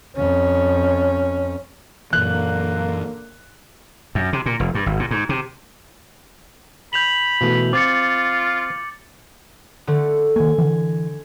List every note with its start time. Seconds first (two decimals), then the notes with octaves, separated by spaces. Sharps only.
0.16 F2 C#4
2.13 F#2 A#2 D3 E3 A#3 F#6
4.15 F#2
4.33 C3
4.46 A#2
4.60 F1
4.75 G2
4.86 G#1
4.99 A#2
5.11 G#2
5.29 C3
6.93 B5 G6 F7 F#7
7.41 B2 E3 A3
7.73 C4 F4 D6 A6 C#7
9.87 D3 A3
10.36 D#3 A#3 G#5
10.58 D3 E3